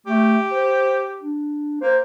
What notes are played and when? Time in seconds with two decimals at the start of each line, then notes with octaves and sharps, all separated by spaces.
0.06 A3 G4
0.51 C5
1.21 D4
1.81 A#3 C5